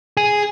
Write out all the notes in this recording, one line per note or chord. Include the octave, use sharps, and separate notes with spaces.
G#4